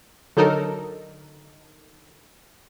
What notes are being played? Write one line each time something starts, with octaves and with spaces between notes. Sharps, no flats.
D3 F#3 D#4 A4 A#4